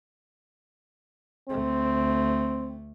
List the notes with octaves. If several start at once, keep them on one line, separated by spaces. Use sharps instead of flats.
D2 A3 C4